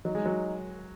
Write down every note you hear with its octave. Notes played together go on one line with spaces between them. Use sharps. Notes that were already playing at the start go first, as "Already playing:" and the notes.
F#3 D#4
G#3
F#3